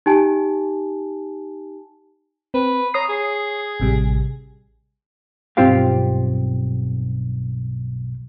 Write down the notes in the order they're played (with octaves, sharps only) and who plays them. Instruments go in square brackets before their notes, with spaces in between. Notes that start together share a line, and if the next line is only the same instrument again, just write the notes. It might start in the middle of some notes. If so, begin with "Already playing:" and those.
[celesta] D#4 G4 G#5 A5
[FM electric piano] C4 [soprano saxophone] B4
[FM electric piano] C#5 D#6 C7 [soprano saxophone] A#5
[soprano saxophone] G#4
[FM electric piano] A1 C3 G3
[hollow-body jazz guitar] B1 G2 C4 F4 G4 F5